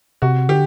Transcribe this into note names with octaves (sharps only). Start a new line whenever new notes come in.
C3 F#4
D3 G4